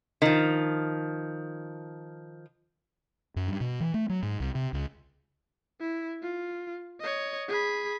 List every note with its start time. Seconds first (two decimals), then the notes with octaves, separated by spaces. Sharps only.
0.22 D#3 F3
3.36 F#2
3.48 G2
3.61 B2
3.80 E3
3.94 A3
4.09 F#3
4.23 G#2
4.40 C2
4.55 C3
4.73 C#2
5.80 E4
6.22 F4
7.01 C#5 D#5
7.48 G#4 B5